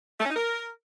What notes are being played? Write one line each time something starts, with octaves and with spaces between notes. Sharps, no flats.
A3
C#4
D#4
A#4